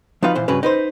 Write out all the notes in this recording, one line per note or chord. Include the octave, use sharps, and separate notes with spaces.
F3 F#3 D#4 F4 B4 F5
A#2 E3 C5
G2 C#3 F#3 C#4 B4
D#4 B4 C5